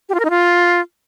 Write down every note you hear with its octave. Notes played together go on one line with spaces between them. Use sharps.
G4
F4
A#4
D#4
F4